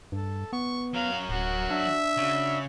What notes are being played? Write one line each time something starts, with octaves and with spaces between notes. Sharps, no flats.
G2 A4
B3 C#6
F#3 A#4 F5
D1 F#4
D4 E5
C#3 F#4